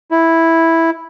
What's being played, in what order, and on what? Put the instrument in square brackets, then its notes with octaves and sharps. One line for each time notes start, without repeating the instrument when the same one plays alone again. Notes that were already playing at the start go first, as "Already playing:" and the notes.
[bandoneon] E4